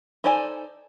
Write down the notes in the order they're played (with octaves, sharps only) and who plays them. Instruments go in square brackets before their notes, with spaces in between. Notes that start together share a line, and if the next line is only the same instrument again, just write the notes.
[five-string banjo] D#4 A4 C5 D5 G#5